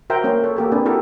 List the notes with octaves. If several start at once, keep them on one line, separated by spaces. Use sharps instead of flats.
F#4 A#4 C5 E5 G5 A#5
A#3 C#4 A#4 C5 G5
A4 C#5
A#3 G4 A4
C4 D4 G4 G#4 B4
E4 F#4 G4 A4 A#4 G#5